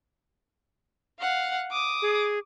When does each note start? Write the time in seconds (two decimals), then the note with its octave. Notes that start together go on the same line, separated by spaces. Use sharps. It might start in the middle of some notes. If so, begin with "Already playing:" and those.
1.21 F5 F#5
1.71 D6 D#6
2.02 G#4